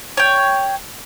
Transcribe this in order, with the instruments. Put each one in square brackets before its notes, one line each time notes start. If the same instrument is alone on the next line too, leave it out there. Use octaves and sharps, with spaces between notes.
[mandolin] C#5 G5